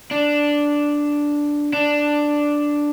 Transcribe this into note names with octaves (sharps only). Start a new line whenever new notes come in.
D4
D4